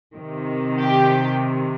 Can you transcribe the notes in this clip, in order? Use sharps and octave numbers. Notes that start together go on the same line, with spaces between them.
C3 D#3
G4